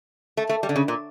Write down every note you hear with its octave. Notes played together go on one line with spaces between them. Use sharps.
A3
A3
G3
D3
C#3
A#2